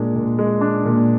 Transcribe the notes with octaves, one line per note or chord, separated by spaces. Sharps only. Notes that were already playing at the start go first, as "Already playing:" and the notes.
Already playing: A#2 G#3 D4
A#2
G#3
D4
A#2